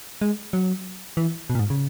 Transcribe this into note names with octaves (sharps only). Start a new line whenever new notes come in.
G#3
F#3
E3
B2
A#2
G#2
C#3